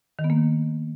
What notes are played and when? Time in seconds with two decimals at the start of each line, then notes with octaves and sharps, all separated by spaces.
0.19 D#3
0.24 B3
0.30 A#3